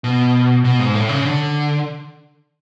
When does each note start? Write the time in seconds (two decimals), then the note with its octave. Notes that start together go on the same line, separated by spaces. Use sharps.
0.04 B2
0.64 B2
0.79 G#2
0.94 A2
1.09 C#3
1.25 D3